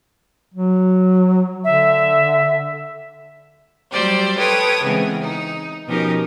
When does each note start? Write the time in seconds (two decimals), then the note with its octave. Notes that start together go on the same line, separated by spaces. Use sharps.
0.54 F#3
1.64 D3 E5
3.92 F#3 G3 G4 C5 D5
4.37 A4 B4 C#5 G5 D#6
4.84 C#3 E3 G#3 B3 C4
5.20 D#4
5.87 B2 F3 C#4 D#4 G4 A#4